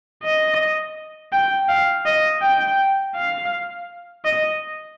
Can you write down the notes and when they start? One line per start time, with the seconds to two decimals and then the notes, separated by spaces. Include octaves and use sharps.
0.24 D#5
1.32 G5
1.69 F5
2.06 D#5
2.42 G5
3.16 F5
4.25 D#5